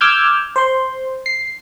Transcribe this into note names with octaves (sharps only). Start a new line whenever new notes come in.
D6 E6 F6 G6 G#6
C5 C6
C7